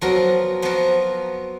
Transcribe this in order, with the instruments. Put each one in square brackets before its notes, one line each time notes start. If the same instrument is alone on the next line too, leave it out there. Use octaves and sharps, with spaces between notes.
[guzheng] F3 B3 F#4 A#4 [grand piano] F#3
[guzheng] F3 B3 F#4 A#4